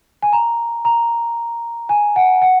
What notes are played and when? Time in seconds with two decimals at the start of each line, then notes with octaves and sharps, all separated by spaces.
0.22 G#5
0.33 A#5
0.85 A#5
1.89 G#5
2.16 F#5
2.42 F#5